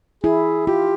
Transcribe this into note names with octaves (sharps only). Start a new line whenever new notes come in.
E4 G#4
F4 G4